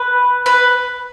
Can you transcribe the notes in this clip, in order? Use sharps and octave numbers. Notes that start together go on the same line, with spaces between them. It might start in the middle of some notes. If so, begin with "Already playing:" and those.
Already playing: B4
B4